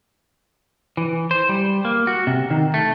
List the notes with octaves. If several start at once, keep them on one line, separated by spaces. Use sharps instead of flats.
E3
C5
G3
A#3
F#4
C3
D#3
A3